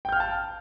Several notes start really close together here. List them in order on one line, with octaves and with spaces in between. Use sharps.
G5 G6 F6 F5 A5